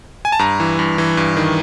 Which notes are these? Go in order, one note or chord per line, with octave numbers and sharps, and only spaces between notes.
G#5
A5
G2 A#5
E3
G2
E3
G2
D#3